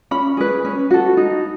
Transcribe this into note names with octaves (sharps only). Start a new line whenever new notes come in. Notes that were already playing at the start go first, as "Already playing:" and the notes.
C#4 B5
G#4 B4
C#4
F#4 A4
D#4